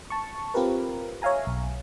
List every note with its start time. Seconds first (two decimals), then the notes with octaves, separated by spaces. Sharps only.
0.10 A5 C#6
0.54 C4 F4 G4 A#4 B4
1.22 C#5 E5 F5 G#5 A#5
1.47 B1